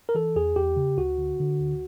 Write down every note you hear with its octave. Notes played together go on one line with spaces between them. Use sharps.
A#4
E3 A4
E2 G#4
E2 G4
C#3
D2 F#4
D3
D3
D2